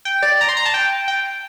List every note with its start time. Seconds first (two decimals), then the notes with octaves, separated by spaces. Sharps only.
0.05 G5
0.22 D5
0.41 A#5
0.49 C6
0.57 A#5
0.65 A5
0.74 G5
1.08 G5